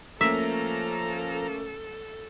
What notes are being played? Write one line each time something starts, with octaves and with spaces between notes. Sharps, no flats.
F3 A3 A#3 C#4 A4 E5 A#5